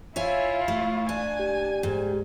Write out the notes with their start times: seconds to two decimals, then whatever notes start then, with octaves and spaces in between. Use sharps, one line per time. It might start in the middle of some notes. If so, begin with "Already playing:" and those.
0.16 E4 F4 C#5 E5 G#5
0.68 A3
1.09 D4 G#5
1.39 G4
1.83 G#2